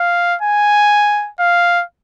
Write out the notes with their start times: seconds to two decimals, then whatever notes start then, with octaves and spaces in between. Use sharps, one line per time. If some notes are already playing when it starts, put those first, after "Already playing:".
Already playing: F5
0.42 G#5
1.40 F5